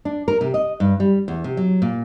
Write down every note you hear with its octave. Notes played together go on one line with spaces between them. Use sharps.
D4
A#4
C3
D#5
G2
G3
E2
C3
F#3
A#2